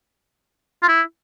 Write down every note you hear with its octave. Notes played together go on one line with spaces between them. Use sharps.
F4
E4